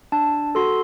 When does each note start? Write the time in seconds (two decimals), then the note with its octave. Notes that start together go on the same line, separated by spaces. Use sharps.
0.12 D4 A5
0.55 F#4 A4 C6